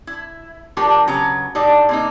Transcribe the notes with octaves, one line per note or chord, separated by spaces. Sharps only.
E4
F3 A3 D4 G4 A#4
C#3 F#3 B3 A#5
A2 G3 D#4 D5
C3 A#3 D#4